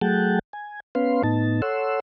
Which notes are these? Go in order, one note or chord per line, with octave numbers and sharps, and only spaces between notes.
F#3 A3 G#4 F#5 G5 A5
G#5
B3 C#4 B4 F5 C6
A2 B3 D#4 A5
A4 C#5 F#5 C6 E6